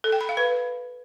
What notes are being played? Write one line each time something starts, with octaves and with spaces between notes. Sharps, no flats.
A4
G5
B5
F5
B4